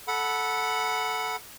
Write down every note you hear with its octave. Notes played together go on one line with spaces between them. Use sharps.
A4 F#5 B5